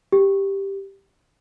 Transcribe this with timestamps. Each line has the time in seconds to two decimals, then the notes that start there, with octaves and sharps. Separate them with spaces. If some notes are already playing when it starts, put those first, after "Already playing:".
0.13 G4